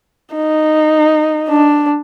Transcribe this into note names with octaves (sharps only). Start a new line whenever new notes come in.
D#4
D4